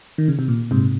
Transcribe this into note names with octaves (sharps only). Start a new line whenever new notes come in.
D#3
C#3
C3
A#2
G#2 C3